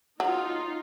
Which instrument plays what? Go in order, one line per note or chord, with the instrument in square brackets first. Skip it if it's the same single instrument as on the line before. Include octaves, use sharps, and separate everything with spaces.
[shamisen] F#3 [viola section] D#4 F4